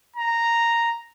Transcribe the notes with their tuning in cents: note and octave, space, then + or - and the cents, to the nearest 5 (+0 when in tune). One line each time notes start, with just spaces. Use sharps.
A#5 -5